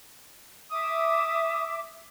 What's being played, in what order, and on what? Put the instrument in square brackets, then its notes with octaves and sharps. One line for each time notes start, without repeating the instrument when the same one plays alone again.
[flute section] E5 D6 [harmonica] D#6